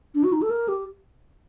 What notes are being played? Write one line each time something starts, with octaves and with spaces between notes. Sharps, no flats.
D4
F#4
D#4
A4
A#4
G4